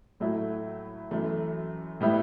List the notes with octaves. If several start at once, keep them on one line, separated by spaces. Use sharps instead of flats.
A2 F#3 A3 E4
F#2 E3 A3
A2 G3 B3 E4